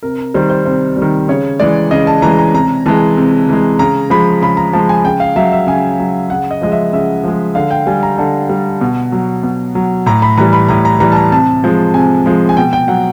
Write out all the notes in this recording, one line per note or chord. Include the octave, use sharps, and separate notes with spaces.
C3 A#4
D#3 G3 C5
C5
C3 C5
G3
D#3
C#3 C#5
E3 G#3 D5
C#3 D#5
A5
E3 G#3 A#5
A#5
C3 A#5
E3 G#3 A5
C3
E3 G#3
C#3 A#5
F3 G#3 B5
C#3 B5
A#5
F3 G#3 A5
G#5
C#3 G5
F5
F#3 E5
E5
C#3 G#5
F#3
C#3 F#5
D#5
F3 G#3 D#5
E5
C#3 E5
F3 G#3
D3 F5
G5
G3 G#5
A#5
D3 A5
G3
B2
F#3
B2
F#3
A2 A#5
B5
E3 G3 A#5
B5
A2 A#5
A#5
E3 G3 A#5
A5
A#5
C3 A5
F3 G#3
C3 G#5
F3 G#3
G#5
B2 G5
G5
F#3 F#5